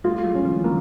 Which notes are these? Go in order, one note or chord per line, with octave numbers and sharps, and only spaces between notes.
G3 A3 F4
F#3 G#3
C#4
D3 E3
D#3 F3 A#3